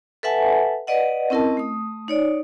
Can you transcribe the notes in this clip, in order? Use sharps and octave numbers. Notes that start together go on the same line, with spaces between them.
A4 B4 E5 F#5 G#5 A5
B4 D5 D#5 F#5
C4 C#4 E4 A#4 D#5 A5
A3 D#6
D#4 C#5 D5